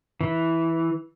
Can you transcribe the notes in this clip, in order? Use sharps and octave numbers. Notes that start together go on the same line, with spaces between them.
E3